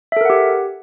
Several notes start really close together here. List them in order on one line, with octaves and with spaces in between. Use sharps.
E5 A4 A#4 F#5 G4